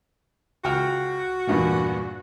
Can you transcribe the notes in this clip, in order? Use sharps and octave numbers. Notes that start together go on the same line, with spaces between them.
C#2 F#4 G5 F6
E2 G2 A#2